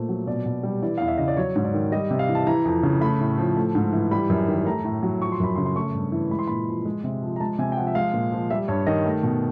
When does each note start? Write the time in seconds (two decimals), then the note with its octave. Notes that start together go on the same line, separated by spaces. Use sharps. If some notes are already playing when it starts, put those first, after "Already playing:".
Already playing: A#2 A3 C5
0.09 F#3
0.27 B2 D5
0.45 B2
0.63 G3
0.82 E3 D5
0.98 E2 F5
1.08 E5
1.18 C#3 D#5
1.28 D5
1.37 F#3 C#5
1.56 G#2
1.64 D5
1.74 D#3
1.92 G3 D#5
2.11 C3
2.19 F5
2.29 E3
2.35 A5
2.47 E3 A#5
2.66 F2
2.83 C#3
3.01 A3 B5
3.21 A2
3.38 F3
3.57 A3
3.75 G#2
3.93 E3
4.11 G3 B5
4.30 F#2
4.48 D#3
4.66 A3 A#5
4.84 A2
5.03 F#3
5.22 F3 C#6
5.32 C6
5.40 F#2 B5
5.56 C#3 C6
5.66 C6
5.76 A3 C#6
5.94 G2
6.12 E3
6.31 G#3 B5
6.39 C6
6.47 A#2 B5
6.67 F3
6.85 G#3
7.04 C3
7.22 F3
7.36 A#5
7.40 G#3 A5
7.59 C3 G#5
7.72 G5
7.77 F3 F#5
7.87 E5
7.95 G#3 F5
8.14 A#2
8.32 F3
8.50 G3 E5
8.68 G2 C#5
8.87 D#3 D#5
9.06 A3
9.23 B2